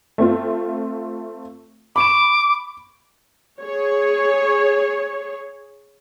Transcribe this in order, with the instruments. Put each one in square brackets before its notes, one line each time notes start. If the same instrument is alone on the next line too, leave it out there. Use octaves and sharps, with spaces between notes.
[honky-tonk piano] A3 C4 F4
[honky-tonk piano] B5 C#6 E7 [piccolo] D6
[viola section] G#4 C#5